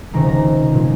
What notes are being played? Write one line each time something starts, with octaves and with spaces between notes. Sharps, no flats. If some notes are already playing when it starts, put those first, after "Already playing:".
C#2 C3 D#3 G#3 A#5
A#5
A#2 F3 G#3